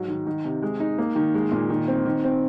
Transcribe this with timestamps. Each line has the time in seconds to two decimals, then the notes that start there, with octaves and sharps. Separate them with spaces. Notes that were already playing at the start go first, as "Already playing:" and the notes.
Already playing: G#2 F#3
0.08 D#3
0.26 D#3
0.45 C3
0.62 G#3
0.80 D#4
0.98 A#3
1.16 D#3
1.34 G#3
1.51 A#2
1.70 D#3
1.88 C4
2.05 D#3
2.24 C4